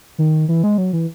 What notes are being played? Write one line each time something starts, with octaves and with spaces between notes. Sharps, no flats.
D#3
E3
G#3
F#3
E3